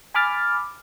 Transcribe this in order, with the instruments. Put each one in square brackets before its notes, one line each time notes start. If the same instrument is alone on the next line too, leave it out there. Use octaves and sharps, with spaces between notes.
[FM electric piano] G#5 B5 D6 F6 A6